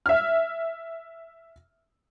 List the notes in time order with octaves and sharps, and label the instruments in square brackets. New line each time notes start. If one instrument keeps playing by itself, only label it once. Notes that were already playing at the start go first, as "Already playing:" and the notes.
[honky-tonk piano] E5 F6